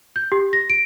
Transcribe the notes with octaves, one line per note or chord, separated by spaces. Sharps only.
G6
G4
A#6
D7